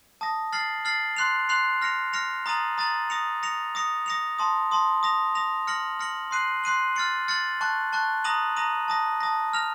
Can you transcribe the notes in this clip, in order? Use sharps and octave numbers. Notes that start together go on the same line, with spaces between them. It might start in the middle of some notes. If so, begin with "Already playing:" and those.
A5 D#6 A#6
F6 A6 C7 F#7
F6 A6 C7 F#7
C6 F#6 C7 F7
C6 F#6 C7 F7
F6 A#6 C#7 F7
F6 A#6 C#7 F7
A#5 D#6 A6 D#7 F#7
A#5 D#6 A6 D#7 F#7
D#6 A#6 C#7 F7
D#6 A#6 C#7 F7
D#6 A#6 C#7 F7
D#6 A#6 C#7 F7
A5 C6 D#6
A5 C6 D#6
D#6 A#6 F7
D#6 A#6 F7
F6 A#6 C#7 F#7
F6 A#6 C#7 F#7
C6 F#6 C7 D#7 F#7
C6 F#6 C7 D#7 F#7
F6 A6 C#7 F#7
F6 A6 C#7 F#7
A5 C#6 F#6
A5 C#6 F#6
A#5 D#6 A#6 D#7 F#7
A#5 D#6 A#6 D#7 F#7
A5 D#6 A#6
A5 D#6 A#6
F6 A#6 F7